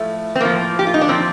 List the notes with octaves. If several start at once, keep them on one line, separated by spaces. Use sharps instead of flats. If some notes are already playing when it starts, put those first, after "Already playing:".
Already playing: A2 F3 A3
C4
A2 F3 A#3
G4
F4
D#4
D4
A#2 F3 C4